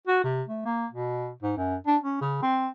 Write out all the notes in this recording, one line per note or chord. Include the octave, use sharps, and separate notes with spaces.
F#4
C3
A3
A#3
B2
G#2
F#2
D4
C#4
C#3
C4